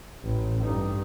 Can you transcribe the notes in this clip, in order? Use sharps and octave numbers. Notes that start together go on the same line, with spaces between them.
A1 A2
G2 D#4